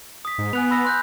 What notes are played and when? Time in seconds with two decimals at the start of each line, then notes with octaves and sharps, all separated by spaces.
0.25 D#6 B6
0.38 G#2
0.53 B3 G#5 F#6 F7
0.71 B5 E6 A#6
0.85 C6 F#6 G6